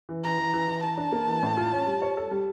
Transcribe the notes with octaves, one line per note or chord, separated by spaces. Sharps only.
E3
E3 A#5
E3
E3
E3
E3 A5
D4
A#3
E3
A2
F4
C#4
G3
C#5
A4
G3